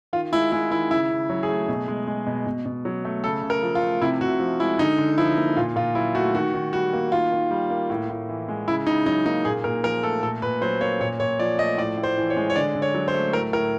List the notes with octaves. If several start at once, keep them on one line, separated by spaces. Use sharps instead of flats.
D#3 F4
G#3 E4
G#3 E4
D#3 E4
C#3 E4
C#3
F#3
G#4
A3
B2
G#3
G#3
B2
B2
B2
F#3
A3
C#3 A4
C#3
A#4
F3
F4
A3
C3 E4
C3 F#4
F3
G#3 E4
D3 D#4
D3
F3 E4
A#3
A#2 F4
A#2 F4
F#3 E4
A3 F#4
D#3 F#4
D#3
G3 F#4
A#3
D#3 F4
D#3
G3
A#3
A2
A2
E3
G#3
C#3 E4
C#3 D#4
F#3 D#4
A#3 D#4
A#2 G#4
A#2 A#4
F3 A#4
A3 A4
A#2 A4
A#2 B4
F#3 C5
A#3 C#5
A#2 C#5
A#2 C#5
F3 D5
A3 D#5
A2 D5
A2
C5
E3
C#5
G#3
C#5
D3 D5
D3
C#5
F#3
C5
A3
A2 A#4
A2 A#4